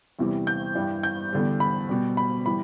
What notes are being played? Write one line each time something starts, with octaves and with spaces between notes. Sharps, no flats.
E2 C3 E3 G3
G6
G2 E3 G3
G6
E2 D3 G3
B5
B2 G3
B5
E3 G3 B5